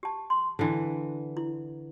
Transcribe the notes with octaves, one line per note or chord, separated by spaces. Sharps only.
G4 A5
C6
D3 E3
E4